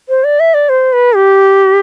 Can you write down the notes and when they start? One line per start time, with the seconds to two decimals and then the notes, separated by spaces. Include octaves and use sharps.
0.09 C5
0.24 D5
0.40 E5
0.54 D5
0.69 C5
0.93 B4
1.16 G4